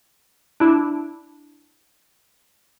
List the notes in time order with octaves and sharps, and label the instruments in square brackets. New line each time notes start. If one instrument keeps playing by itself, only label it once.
[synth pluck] D4 E4